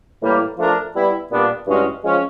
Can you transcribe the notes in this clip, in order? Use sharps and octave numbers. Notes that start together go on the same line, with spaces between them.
A2 E3 G3 A#3
F3 A3 D4 F4 A#4
G3 B3 E4
A#2 G3 B3 D4 F4
G2 E3 G#3 C#4 F#4
F3 G#3 C#4